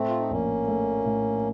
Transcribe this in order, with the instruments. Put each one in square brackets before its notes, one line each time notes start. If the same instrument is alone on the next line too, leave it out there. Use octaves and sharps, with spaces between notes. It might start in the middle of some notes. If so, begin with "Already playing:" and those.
Already playing: [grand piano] A2 [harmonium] A3 C4
[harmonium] F4
D#4
[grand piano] A#1 [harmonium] A#3 C#4
[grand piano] A3
A2